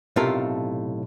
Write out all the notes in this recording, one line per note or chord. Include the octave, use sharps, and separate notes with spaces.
B1 A2 C3 F4 A4 A#4